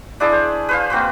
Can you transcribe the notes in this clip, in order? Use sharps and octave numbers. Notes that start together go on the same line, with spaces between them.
D4 E4 G#4 D5
C5
B4 C5 F5
A#3 C4 F#4 B4